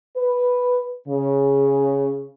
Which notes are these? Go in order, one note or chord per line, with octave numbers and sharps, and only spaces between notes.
B4
C#3